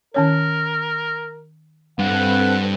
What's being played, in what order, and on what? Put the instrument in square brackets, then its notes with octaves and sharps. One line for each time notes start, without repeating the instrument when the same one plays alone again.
[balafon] D#3 C#4 C#5 [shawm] A#4
[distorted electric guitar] G2 [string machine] C4 A4 B4 [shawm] F#5